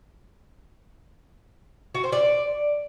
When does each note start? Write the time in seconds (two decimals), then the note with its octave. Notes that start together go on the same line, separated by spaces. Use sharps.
1.95 F#4
2.03 C5
2.12 D5